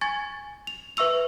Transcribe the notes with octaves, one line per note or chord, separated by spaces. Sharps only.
G#5 C#6 G#6 A6
F7
B4 E5 C#6 E6 F7